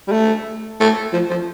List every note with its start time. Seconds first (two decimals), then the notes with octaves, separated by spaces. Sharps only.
0.08 G3
0.12 A3
0.80 A3
1.13 F3
1.30 F3